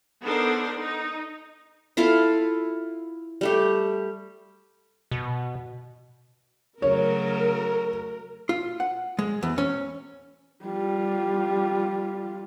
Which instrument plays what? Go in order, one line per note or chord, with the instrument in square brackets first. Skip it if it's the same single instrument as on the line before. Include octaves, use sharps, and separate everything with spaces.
[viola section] B3 D4 D#4 A4 A#4 C5
D#4
[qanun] E4 F4 A4 F5
G3 A3 G4
[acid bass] B2
[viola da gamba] C#3 F#3 A3 [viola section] A#4 [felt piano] C#5
[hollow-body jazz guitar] F4
F#5
G#3
E2
C#4
[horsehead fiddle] G3 F4